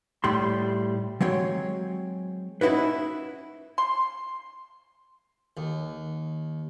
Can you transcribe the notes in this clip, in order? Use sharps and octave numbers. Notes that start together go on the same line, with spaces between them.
A2 G3 C6
F#3 G#3 C4 C#5
C#4 D#4 E4 F#4 B4
C6
D#2